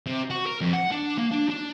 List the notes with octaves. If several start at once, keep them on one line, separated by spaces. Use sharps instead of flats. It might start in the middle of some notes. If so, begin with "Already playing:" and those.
C3
F#4
A#4
F2
F#5
D4
A#3
D4
D4